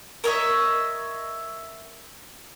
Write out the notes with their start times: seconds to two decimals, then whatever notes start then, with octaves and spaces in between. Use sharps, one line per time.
0.24 A#4 C#5 D#5 E5